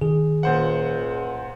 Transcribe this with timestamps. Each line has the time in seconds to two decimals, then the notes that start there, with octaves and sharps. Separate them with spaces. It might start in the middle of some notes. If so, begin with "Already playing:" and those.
0.01 D#3 G#4
0.43 C#2 A#2 C5 F#5